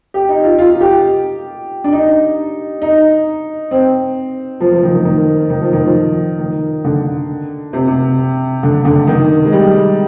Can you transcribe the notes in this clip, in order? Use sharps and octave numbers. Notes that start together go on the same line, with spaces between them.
G4
D#4
F4
F4
G4
D4
D#4
D#4
C4
F3
F3
D#3
D#3
D#3
D#3
F3
D#3
F3
D#3
D3
C3
C3
D3
D3
D#3
G#3
G3